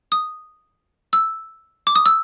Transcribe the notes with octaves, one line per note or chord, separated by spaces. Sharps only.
D#6
E6
D6
D#6
E6